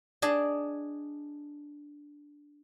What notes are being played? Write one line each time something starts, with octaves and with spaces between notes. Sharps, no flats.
D4 G#4 D#5